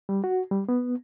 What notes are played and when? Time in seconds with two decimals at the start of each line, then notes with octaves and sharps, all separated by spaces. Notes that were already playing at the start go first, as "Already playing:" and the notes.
0.09 G3
0.24 F#4
0.51 G3
0.69 B3